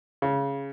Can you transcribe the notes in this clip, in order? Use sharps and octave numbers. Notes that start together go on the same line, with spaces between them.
C#3